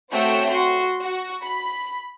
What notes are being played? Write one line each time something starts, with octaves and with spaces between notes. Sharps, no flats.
A3 C4 F#4 C#5 G5 E6
F#4 C6
F#4
B5